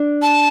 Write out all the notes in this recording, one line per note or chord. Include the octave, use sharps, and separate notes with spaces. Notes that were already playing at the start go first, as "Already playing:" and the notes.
Already playing: D4
A5